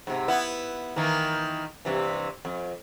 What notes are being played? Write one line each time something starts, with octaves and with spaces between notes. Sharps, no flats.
G#2 C3
B3 E4
D#3 E3 A#3
G2 C3 E3
F2